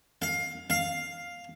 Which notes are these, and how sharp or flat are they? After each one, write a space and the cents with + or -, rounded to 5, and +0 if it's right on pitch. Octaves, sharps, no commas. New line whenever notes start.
F5 +20
F5 +5